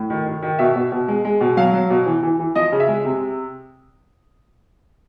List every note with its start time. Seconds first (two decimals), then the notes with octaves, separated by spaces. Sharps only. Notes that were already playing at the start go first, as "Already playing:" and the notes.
Already playing: A2
0.10 D#3
0.26 D#3
0.42 D#3
0.59 B2 E5
0.75 B2
0.92 B2
1.08 G#3
1.25 G#3
1.41 B2
1.57 F#3 F5
1.73 F#3
1.90 B2
2.06 E3
2.22 E3
2.39 E3
2.55 F3 D#5
2.72 C#3
2.80 E5
2.88 G#3
3.05 C3